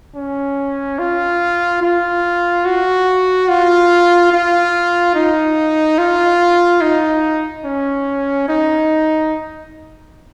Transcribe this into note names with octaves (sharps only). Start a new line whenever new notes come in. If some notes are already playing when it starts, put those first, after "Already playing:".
C#4
F4
F4
F#4
F4
F4
D#4
F4
D#4
C#4
D#4